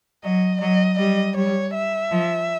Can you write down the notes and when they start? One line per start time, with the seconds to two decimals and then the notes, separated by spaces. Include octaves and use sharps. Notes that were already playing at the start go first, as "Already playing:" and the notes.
0.24 F#3 D#5
0.61 F#3 D#5
0.98 G3 D#5
1.36 G3 C#5
1.74 E5
2.11 F3